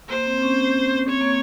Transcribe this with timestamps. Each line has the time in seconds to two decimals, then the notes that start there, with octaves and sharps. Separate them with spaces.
0.10 A#3 C5
0.26 C4
0.38 C4
0.43 C#4
1.09 C4 C#5
1.21 A#3